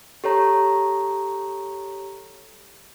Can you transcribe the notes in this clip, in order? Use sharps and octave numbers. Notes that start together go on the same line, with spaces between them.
G4 A4 C#5 A#5